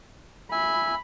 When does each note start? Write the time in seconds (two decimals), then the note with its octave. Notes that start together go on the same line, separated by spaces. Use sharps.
0.52 E5 G#5 B5